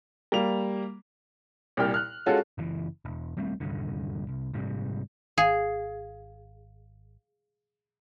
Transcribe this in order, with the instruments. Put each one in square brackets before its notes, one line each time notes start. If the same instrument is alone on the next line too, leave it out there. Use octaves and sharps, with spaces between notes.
[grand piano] G3 A#3 F7
[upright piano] C2 A#2 G4 G5 F6
F6 F#6
G#3 C#4 F4 F#4 A4
[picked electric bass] F#1 E3
E1
D#1 G3 A3 C4
D#1 C2 G2 D3
C2
A#1 G#2 C3 G3
[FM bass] G#1 [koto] G#4 [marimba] F5